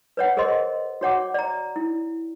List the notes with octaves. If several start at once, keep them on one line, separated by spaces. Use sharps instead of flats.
B4 C#5 F#5
G#4 A#4 C5 D#5 C6
F#4 C#5 F#5 D6
D5 A#5
E4